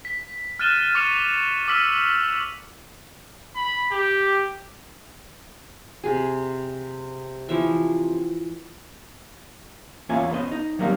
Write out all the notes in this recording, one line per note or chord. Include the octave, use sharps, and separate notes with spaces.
B6
F6 F#6 A6 D#7 E7 G7
C#6 D6 F6 C#7 D#7 F7
D6 E6 F6 B6 D#7 F#7
B5
G4
C3 G#4
E3 F3 E5
E2 A#3 C#4 F4 E5 G#5
B3 C#4 C5 D#5
D#4
D#3 F#3 G3 A#3 C4 D#4